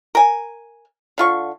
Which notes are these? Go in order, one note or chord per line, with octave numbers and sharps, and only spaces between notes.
A#4 G#5
D3 F4 C#6